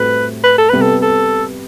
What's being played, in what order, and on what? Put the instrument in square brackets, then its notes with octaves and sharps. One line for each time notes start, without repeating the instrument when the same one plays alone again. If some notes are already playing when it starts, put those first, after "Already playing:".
Already playing: [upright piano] A2 G3 C4 F#4 A4 [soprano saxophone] B4
[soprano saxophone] B4
A4
[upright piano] C3 G3 B3 [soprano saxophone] B4
[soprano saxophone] A4
A4